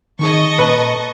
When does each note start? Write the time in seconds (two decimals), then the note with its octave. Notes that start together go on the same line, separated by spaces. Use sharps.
0.19 D#3 D#4 G#4 D#5 A5 C#6
0.58 A#2 A4 B4 A#5